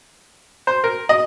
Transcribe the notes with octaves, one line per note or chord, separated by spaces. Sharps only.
C5
A#4
D#5